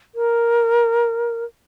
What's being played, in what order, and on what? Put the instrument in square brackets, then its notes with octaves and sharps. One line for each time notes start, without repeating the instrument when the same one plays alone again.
[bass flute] A#4